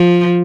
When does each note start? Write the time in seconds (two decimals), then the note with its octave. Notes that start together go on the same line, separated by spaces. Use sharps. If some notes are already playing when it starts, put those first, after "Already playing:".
Already playing: F3